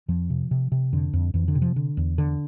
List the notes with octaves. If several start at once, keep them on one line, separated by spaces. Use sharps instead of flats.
F2 F3
C3
C3
C3
F2 D3
F2
F2 E3
D3
C3
F3
D3
E2
D3